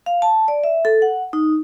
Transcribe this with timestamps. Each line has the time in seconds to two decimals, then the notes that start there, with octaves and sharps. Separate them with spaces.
0.06 F5
0.22 A5
0.48 D5
0.64 E5
0.85 A4
1.02 F#5
1.33 D#4